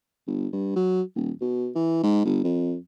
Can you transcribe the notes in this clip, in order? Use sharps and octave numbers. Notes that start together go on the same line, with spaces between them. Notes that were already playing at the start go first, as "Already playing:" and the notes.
G1
G2
F#3
D#1
B2
E3
G#2
G1
F2